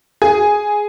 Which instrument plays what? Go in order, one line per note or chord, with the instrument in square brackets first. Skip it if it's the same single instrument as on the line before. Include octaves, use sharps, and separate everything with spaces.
[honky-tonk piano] G#4